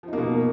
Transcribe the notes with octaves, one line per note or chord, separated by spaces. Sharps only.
B2 F3 A#3 D#4